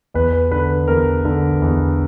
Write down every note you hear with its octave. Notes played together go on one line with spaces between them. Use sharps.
E2 B4
B4
D3 B4
E2 A#4
D3
E2